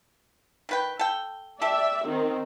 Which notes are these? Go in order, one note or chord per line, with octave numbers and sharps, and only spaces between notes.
D#3 B4 G5
A4 G5
G4 A4 D5 E5
D#3 C4